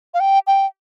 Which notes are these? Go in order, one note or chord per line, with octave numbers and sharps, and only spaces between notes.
F5
G5
G5